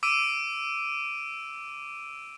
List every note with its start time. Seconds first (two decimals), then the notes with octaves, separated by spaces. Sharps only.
0.03 D6 E6 D7 D#7